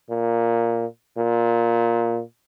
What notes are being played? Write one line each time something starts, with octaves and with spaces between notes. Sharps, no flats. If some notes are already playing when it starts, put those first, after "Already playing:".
A#2
A#2